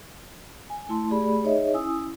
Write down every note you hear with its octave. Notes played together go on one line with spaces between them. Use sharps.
G#5
A3 E4 A5 C6
A3 G4 G#4 D5 B5
D#4 G#4 C#5 D#5 E5
C#4 E4 G#5 D#6 E6